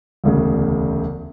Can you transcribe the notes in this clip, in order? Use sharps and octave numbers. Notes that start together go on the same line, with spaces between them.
E1 D2 C#3